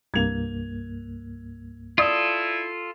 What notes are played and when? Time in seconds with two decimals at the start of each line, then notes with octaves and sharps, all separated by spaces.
0.14 C2 G2 A#3 G#6 F7
1.98 E4 F4 A4 D5 D#6